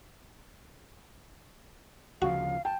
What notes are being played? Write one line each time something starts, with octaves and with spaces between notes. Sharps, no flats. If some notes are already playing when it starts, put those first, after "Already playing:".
D2 C#3 F3 F#4 F5
G5 A5